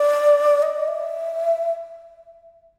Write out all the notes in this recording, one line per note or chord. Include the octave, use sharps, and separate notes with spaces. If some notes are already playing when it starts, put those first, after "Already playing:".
Already playing: D5
D#5
D#5
E5